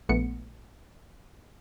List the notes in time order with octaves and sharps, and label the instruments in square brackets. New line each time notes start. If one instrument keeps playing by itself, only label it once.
[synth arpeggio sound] A#1 A3 B3 C#7